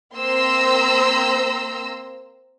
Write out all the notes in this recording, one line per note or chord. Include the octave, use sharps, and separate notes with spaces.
A#3 C4 C5 A#5 C6 E6